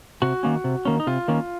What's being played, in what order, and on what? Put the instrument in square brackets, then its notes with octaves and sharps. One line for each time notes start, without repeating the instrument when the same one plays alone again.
[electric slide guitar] C3 F#4
D#3 A#3 C#4
C3
D#3 A#3 C#4
D#4
C3 F4
D#3 A#3 C#4